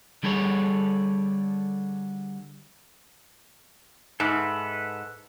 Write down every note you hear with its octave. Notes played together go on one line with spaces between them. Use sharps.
D3 G3 G#4 A4 C#5
G#2 A4 B4 E5